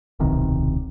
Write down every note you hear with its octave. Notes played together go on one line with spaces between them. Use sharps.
D1 B1 C3 D#3